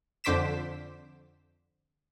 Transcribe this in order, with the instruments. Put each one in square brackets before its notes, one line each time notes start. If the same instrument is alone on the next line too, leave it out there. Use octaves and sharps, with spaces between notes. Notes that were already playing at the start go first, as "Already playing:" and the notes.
[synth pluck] F2 D3 C5 D6 B6 E7